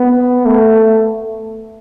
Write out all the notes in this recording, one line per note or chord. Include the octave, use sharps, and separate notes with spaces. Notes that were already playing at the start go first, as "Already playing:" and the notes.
Already playing: B3
A3